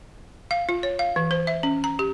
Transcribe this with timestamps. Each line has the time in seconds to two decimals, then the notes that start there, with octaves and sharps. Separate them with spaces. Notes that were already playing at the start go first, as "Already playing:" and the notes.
0.51 F5
0.69 F4
0.83 C#5
0.99 F5
1.16 E3
1.31 C5
1.47 E5
1.63 C#4
1.84 A#5
1.99 G4